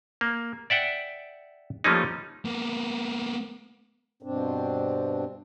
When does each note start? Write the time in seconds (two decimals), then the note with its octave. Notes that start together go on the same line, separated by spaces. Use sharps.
0.21 A#3
0.70 D5 E5 F#5 G5
1.84 F3 G3 A3 A#3 C#4 D#4
2.45 A#3 B3
4.23 G2 B2 C4 D4